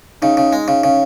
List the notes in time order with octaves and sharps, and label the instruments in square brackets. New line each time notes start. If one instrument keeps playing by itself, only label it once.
[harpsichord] C#3 [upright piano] D#4
[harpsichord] C#3
G#3
C#3
[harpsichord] C#3 [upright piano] C#4